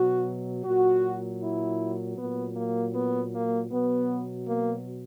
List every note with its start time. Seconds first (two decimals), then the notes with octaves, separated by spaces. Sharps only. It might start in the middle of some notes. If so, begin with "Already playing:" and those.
Already playing: B2 F#3 F#4
0.65 A#2 F#3 F#4
1.42 E4
2.17 A#2 F#3 B3
2.56 A#3
2.95 B3
3.33 A#3
3.71 B2 F#3 B3
4.48 A#3